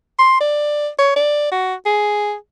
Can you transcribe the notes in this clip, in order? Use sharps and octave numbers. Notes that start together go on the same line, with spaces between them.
C6
D5
C#5
D5
F#4
G#4